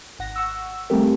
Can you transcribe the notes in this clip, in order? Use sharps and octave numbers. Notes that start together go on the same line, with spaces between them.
G#1 F#5 A#6
F#5 C#6 E6
G3 A3 C4 G4 A#4